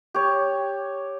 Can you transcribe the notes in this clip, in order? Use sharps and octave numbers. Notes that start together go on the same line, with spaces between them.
G4 C#5